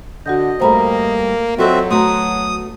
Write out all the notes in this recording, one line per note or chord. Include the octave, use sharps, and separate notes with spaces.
D3 F#4 D#5 F#5 G6
G2 G3 A3 A#3 C5 A#5 B5
F#3 C4 F4 F#4 A4 D#5 E5
A3 B3 F#4 A#5 C6 D#6